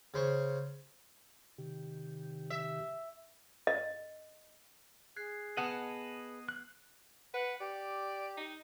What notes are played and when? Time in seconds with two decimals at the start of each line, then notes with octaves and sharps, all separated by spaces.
0.14 C#3 C5 C#5
1.58 C3 D#3 G4
2.50 E5
3.67 D#5
5.16 G#4 F#6 G#6 C7
5.57 B3 D#5 F#5 A5
6.49 F#6
7.34 B4 F#5
7.61 G4 D5
8.37 D#4